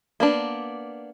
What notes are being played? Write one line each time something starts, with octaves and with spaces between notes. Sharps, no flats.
A#3 B3 D4